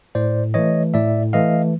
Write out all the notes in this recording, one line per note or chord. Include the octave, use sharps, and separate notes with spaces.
A2 C5 D5
E3 A3 C#5 D#5
A2 D5 E5
E3 A3 D#5 F5